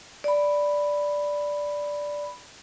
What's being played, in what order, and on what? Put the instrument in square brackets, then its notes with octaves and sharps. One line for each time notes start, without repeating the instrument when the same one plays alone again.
[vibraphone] D5 B5